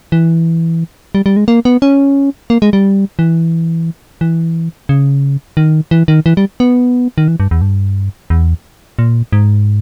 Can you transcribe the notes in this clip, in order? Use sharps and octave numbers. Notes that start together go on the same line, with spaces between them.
E3
G3
G3
G#3
A#3
B3
C#4
A#3
G#3
G3
E3
E3
C#3
D#3
E3
D#3
E3
G3
B3
D#3
E3
G2
E2
G2
E2
A#2
G#2